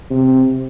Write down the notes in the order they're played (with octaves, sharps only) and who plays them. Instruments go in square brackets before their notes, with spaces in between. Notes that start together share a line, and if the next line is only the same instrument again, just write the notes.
[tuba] C3